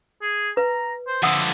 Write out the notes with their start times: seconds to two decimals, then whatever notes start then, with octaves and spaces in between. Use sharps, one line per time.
0.22 G#4
0.57 B4 A#5
1.07 C5
1.23 F2 D3 E5 F#5 D#6